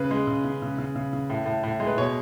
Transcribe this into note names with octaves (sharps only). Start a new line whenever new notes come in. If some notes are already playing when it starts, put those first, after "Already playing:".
Already playing: C#3 B4
G#3
C#3
C#3
C#3
C#3
C#3
C#3
A2
A2
A2
G#3
B4
B2 C#5